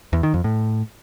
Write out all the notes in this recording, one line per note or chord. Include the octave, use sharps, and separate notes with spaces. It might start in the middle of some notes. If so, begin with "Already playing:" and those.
E2
D#3
F2
A2